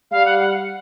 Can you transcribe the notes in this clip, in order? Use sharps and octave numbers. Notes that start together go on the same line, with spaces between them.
G3 F5
F#5
F#5